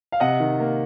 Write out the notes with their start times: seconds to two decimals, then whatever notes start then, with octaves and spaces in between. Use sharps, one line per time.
0.12 F5
0.20 C3 D#5 F#5
0.40 D#3
0.60 A#3